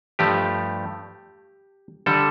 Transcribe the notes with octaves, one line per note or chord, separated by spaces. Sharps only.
G2 F3 A3 G4
D3 G3 A4